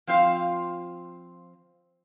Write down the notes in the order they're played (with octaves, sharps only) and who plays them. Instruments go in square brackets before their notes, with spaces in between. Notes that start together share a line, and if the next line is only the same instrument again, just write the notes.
[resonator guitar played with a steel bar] F3 C4 F4 F5